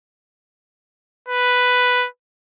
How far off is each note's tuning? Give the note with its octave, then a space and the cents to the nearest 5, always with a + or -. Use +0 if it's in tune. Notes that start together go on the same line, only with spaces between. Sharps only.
B4 +5